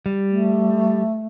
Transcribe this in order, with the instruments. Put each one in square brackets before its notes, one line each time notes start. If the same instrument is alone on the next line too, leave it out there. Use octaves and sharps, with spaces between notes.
[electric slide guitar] G3
[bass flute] A3